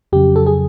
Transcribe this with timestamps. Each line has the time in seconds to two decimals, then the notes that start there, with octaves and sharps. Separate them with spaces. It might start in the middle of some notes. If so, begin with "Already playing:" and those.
0.12 F2 C#3 F#3 G4
0.36 A4
0.46 G#4